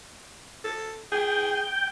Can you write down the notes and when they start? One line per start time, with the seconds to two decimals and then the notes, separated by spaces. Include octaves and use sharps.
0.64 A4
1.12 G#4 G5